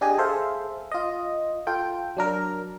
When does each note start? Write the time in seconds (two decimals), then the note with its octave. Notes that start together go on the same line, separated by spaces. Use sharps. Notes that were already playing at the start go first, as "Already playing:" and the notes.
0.01 D4 G4 G#4 D#5 G#5
0.18 G#4 A4 C5 E5 F5
0.91 F4 D#5
1.67 F4 A4 G5
2.17 F#3 D4 A#4